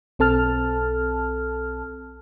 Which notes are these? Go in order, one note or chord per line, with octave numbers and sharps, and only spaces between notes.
B1 C4 A4 A5 F6